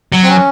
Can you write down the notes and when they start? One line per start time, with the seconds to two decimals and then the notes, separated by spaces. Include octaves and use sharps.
0.14 F#3
0.23 C4
0.29 C#4